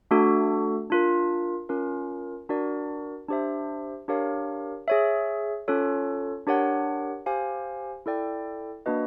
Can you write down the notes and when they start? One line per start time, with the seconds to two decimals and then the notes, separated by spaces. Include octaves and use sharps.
0.11 A3 D4 F#4 A4
0.90 D4 F4 A#4
1.69 C#4 F4 A#4
2.49 D4 F#4 A#4 D5
3.28 D4 G4 C5 E5
4.08 D4 G4 A#4 C#5 F5
4.88 G#4 C#5 E5
5.68 C#4 F4 A4 C#5
6.47 D4 G4 A#4 C#5 F#5
7.26 G4 C5 F5 G#5
8.06 E4 A4 D5 G5
8.86 A#3 D4 F#4 B4 D#5